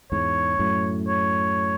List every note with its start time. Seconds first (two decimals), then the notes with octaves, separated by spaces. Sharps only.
0.11 E2 G#2 C#5
0.59 F#2 A2
1.08 C#5